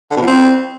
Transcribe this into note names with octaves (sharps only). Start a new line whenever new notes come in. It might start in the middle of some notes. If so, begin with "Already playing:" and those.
D3
B2
F3
C4